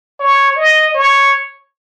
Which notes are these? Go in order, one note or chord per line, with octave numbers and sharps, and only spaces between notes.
C#5
D#5
C#5